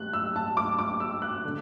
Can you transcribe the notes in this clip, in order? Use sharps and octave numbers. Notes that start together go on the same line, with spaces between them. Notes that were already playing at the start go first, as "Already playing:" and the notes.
Already playing: G3 F#6
E6
A5
D6
D6
E6
F#6
D3